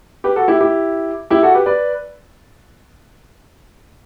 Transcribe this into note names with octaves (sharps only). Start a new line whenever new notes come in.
G4 B4
F#4 A4
E4 G4
E4 G4
E4 G4
F#4 A4
G4 B4
B4 D5